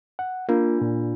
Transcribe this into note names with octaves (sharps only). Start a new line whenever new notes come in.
F#5
A#3 D4 F4
A#2